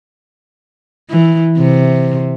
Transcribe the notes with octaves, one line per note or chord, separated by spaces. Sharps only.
E3
C3